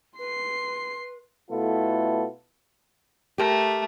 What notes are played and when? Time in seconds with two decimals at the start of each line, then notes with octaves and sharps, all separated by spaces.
0.19 B4 C6 C7
1.51 B2 A3 B3 E4 F4 A4
3.38 A3 G4 A#4